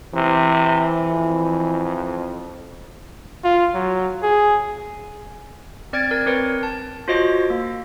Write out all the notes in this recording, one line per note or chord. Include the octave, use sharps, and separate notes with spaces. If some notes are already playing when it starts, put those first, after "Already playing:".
C3 E3
F2
F4
F#3
G#4
C4 D5 F6 G#6 A6 D7
A#4 G#6
C4 A#4 B4 C#5
A5
F4 F#4 C5 C#5 D#5 A#6
A#3